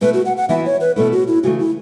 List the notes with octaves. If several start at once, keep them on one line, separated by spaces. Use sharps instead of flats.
B2 A3 E4 B4
F#4
F#5
F#5
E3 B3 E4 E5
C#5
B4
B2 A3 E4 A4
F#4
E4
C#3 E3 A3 F#4
E4